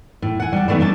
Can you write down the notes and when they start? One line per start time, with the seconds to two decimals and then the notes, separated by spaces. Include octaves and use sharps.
0.22 A2
0.40 F#5 G#5
0.52 G3 A5
0.68 E3 G3 A3 B3 D#4
0.80 G3 C#4 A5